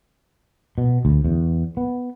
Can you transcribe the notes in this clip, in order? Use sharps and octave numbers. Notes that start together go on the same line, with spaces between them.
B2
D2
E2
B3